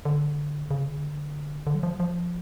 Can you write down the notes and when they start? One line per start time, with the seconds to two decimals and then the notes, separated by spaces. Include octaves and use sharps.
0.05 D3
0.71 C#3
0.87 D3
1.67 D3
1.75 F#3
1.83 F3
2.00 F3